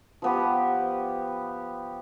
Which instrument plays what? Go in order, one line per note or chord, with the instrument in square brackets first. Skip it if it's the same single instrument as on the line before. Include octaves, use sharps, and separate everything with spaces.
[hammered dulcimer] F3 B3 G4